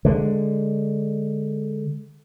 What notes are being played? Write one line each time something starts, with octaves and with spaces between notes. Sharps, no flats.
D3 G#3